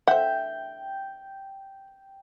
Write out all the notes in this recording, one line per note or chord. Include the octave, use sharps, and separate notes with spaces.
C5 E5 F#5 G5